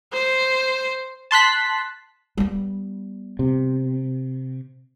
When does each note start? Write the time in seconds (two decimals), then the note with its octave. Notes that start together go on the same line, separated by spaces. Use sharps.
0.12 C5
1.31 A5 C6 F#6 B6
2.38 G3 B3
3.39 C3